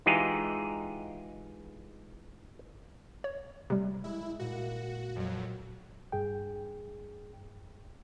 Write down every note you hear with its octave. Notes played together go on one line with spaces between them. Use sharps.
E3 G#3 D#4 F4 G4 G#4
C#5
C3 G3
G#3 E4
A#2 F#4
F2 F#3
G2 G#4 G5